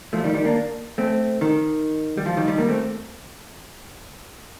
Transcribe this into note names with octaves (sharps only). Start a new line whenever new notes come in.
F3 A3
D#3 G3
D#3 G3
A#3 D4
A3 C4
D#3
G3
F3
D#3 G3
D#3 G3
G3 A#3
A3 C4